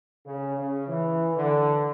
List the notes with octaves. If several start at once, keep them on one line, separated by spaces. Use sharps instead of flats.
C#3
C#3
E3
D3